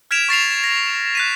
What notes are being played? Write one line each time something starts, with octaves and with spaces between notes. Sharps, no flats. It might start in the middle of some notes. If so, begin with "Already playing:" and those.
F6 G#6 B6 D7 E7 F7
C#6 A6 C7 F7
A#6
F#6 B6 D#7